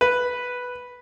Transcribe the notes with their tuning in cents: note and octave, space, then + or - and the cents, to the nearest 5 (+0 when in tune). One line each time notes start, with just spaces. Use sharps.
B4 +0